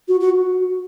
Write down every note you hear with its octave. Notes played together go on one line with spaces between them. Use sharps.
F#4
F#4